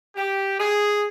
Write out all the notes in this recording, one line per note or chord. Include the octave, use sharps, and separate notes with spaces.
G4
G#4